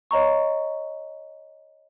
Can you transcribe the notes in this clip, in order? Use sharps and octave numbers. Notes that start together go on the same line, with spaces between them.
C#5 D#5 A#5 C#6